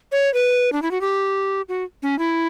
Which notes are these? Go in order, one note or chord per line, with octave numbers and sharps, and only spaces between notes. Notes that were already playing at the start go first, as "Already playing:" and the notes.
C#5
B4
D4
E4
F#4
G4
F#4
C#4
E4